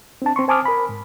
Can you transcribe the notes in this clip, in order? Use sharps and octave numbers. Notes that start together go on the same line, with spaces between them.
C4 D4 A5
C4 C6 C#6
C5 G#5 A5 D6 D#6 F6
A#4 B5
G#2